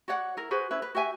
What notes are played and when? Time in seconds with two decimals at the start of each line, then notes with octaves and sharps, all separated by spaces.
0.08 F#4 C#5 D5 F#5
0.37 E4 A#4
0.51 F#4 G#4 B4 C5
0.71 C#4 E4 B4
0.82 B4
0.95 F#4 G4 E5 G#5